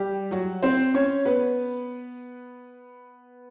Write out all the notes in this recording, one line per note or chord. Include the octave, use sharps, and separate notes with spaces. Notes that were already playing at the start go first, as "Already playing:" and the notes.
Already playing: G3 G4
F#3 F#4
C4 C5
C#4 C#5
B3 B4